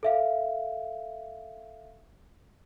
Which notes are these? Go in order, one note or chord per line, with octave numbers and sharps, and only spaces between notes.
A4 E5 F5